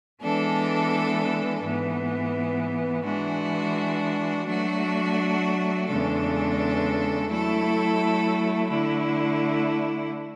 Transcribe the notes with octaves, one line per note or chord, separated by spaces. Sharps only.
E3 G#3 B3 D4 A4
G#2 E3 B3
E3 G#3 D4 F#4
F#3 A3 D4 F#4
E2 C#3 G#3 D4 A4
F#3 A3 E4 A4
D3 A3 E4